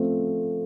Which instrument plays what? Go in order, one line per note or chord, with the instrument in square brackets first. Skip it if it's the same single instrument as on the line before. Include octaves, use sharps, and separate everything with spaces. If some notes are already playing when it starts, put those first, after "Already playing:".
Already playing: [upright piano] F3 A3 C4